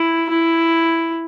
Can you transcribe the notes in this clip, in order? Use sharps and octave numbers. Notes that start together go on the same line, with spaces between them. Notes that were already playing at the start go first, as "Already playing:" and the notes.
Already playing: E4
E4